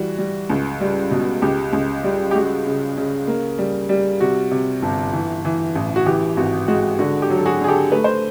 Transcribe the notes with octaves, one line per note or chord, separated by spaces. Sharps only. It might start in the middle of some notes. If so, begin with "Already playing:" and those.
Already playing: E3 G3 F#4
G3
C#2
G3
B2
C#2 G4
C#2
G3
G4
G#3 F#4
C#3
C#3
A#3
G3
G3
C3 F#4
C3
G1
E3
E3
A1
F#4
E3 G4
G#1 F#4
G#3 F#4
D3 F#4
G4
F#3
A4
F#4 G#4
D3 G#4
G4 A4
A3 B4
C5